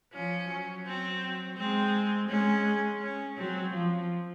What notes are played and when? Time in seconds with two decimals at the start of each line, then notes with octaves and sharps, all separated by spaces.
0.13 F3 C#4
0.50 F#3
0.86 C4
1.57 G#3 C4
2.30 G#3 C#4
3.02 C#4
3.37 F#3 C4
3.74 F3